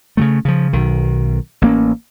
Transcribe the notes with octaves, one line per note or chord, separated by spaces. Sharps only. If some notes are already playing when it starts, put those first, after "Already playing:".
C#3 E3 A3
C#3 F3
B1 D#3
A1 A#3 C#4